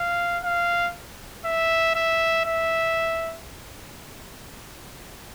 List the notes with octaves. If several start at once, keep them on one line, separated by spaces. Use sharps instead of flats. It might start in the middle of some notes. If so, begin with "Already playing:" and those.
Already playing: F5
F5
E5
E5
E5